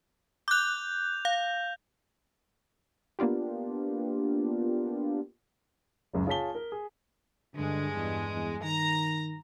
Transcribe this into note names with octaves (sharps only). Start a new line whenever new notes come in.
D6 F#6 G6 F7
F5
A#3 B3 D4 F4 G4
F#1 C#2 F#2
F4 G#4 C#5 A5 B6 G7
A#4
G#4
G2 D3 G#3
E2
E2
D#3 A#5